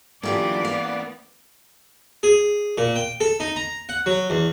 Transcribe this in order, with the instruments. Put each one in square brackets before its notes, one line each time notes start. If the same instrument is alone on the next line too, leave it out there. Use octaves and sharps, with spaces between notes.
[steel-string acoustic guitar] D3 F4 G4 [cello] E3 D5 [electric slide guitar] F#3 A#3
[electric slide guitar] A#3 B3 [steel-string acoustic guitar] F5
[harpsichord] G#4
A#2
G5
A4
D#4
A#5
F#5
F#3
E2